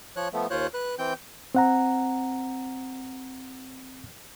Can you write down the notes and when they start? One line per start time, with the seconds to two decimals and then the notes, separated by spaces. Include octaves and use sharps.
0.16 F3 C#5 F#6
0.33 F3 A3 B3
0.50 D#2 F4 C5 C#5 F#6
0.74 B4 F#6
0.99 E3 C4 G5 G6
1.55 C4 F#5 A#5